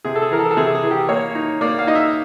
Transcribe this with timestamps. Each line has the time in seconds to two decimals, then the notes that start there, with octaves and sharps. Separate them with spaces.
0.05 C3 G#4
0.16 A4
0.22 G#4
0.31 E3 A#4
0.39 A4
0.51 A4
0.57 C3 G#4
0.75 G#4
0.83 E3
0.91 G4
1.09 A#3 C#5
1.35 D#4
1.61 A#3 D5
1.79 F5
1.87 D#4 D#5
1.95 E5